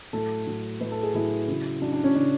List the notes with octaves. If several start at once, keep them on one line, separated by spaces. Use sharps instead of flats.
A2 F#3 A4
A2 F#3
A2 F#3 B4
A4
G#4
A2 F#3 E4
C#3 F#3
C#3 F#3 D4
D4
C#4
C#3 F#3 D4